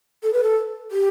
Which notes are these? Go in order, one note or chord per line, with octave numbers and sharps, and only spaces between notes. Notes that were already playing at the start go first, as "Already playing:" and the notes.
A4
B4
A4
G4